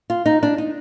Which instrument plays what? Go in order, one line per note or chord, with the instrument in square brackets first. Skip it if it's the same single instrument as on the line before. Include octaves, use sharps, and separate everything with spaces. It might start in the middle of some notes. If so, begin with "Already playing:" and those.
[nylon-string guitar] F4
D#4
D4
D#4